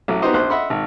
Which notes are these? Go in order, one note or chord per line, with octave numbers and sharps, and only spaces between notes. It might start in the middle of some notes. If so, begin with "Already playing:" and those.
A1 F#3
B3 D#4 F#4 G4 C5 D#5
A#1 C5 F#6
D#5 E5 F#5 B5 C6
G#1